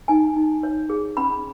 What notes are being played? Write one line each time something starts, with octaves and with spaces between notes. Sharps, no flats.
D#4 G#5
D#4
C#5
G#4
C#4 B5